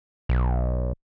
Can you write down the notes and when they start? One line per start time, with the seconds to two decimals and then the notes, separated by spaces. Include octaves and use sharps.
0.29 B1